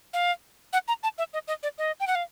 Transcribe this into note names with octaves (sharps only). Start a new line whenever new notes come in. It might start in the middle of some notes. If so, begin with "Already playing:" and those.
F5
F#5
A#5
A5
E5
D#5
D#5
D5
D#5
G5
F#5
F5